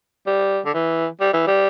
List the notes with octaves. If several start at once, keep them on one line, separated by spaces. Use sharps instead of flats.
G3
D3
E3
G3
E3
G3